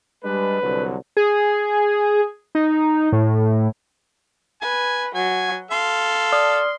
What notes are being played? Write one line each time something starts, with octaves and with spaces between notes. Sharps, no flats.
G3 G#3 D4 B4
C2 D3 F#3
G#4
D#4
A2
B4 G#5
F#3 G#5
A4 F5 C6
D5 D#6 F6